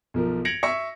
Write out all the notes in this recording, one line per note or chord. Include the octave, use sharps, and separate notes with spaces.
B1 F3 A#4
G#6 A#6 C#7 D7 F7 F#7
E5 C#6 A#6 C#7